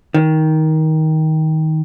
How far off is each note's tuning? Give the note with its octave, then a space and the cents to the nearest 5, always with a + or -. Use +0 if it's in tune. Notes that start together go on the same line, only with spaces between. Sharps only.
D#3 +15